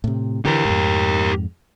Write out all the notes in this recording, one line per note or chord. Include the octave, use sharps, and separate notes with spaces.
A2 C3
D3 E3 G4 A#4
F2 G#2